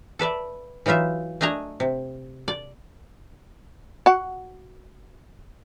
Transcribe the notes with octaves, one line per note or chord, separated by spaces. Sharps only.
A4 B4 D5 E5
E3 F#3 D#4 F4 E5
A3 D4 D#5 G#5 A#5
C3
D5
F#4 F#5